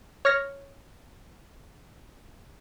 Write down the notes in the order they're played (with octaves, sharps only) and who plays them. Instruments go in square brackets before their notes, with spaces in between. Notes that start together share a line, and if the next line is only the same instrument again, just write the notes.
[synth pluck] C#5 F6 A#6